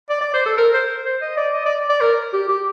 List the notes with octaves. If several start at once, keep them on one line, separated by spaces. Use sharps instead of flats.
D5
D5
C5
A4
A#4
C5
C5
D#5
D5
D#5
D5
D5
A#4
G4
G4